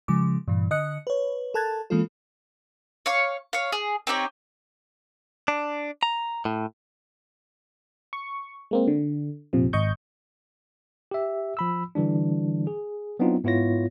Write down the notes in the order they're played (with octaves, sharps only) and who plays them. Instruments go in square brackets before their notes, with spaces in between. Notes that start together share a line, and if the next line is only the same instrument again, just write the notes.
[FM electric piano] C#3 F3 G#3 D6
G2 A#2 E3
D3 D#5 D#6 F#6 C#7
B4 C#5
A4 A#4 A5 F#6 G#6 A6
E3 G#3 A#3 C4 F4 A4
[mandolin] C#5 F5 C#6
C#5 F5
G#4
C4 D#4 G4 C#5
[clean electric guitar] D4
A#5
A2
[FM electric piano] C#6
G#3 A#3 C4
D3
A#1 F2 C3 F3
G#1 D#5 C#6 G6
[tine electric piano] G4 E5
F3 B5 E6
D3 E3 G3 D4
G#4
F#3 B3 C4 D4 D#4 F4
G#2 B3 E4 F4 C#5 A#6